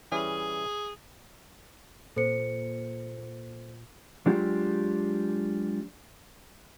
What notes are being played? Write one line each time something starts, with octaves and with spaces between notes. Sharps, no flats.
E3 G3 C#4 G#4
A#2 A4 C5 C#7
F#3 G#3 D4 F4 G4